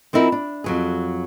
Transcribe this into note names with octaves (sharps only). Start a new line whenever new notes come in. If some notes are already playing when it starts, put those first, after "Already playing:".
F3 C4 D#4 E4 A#4
D4
F2 F#3 G#4